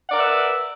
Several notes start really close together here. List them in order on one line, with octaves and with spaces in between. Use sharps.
F#5 D5 A#4 B4 E5